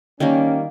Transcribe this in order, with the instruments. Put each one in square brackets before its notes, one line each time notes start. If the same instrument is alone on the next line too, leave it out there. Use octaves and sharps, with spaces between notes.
[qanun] D#3 G3 A#3 [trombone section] C#4